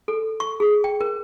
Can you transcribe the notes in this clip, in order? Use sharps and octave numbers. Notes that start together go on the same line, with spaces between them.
A4
C#6
G#4
G5
A#4